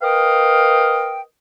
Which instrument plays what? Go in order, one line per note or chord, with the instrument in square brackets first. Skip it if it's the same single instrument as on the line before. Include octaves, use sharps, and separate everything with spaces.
[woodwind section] A#4 B4 D#5 F5 G5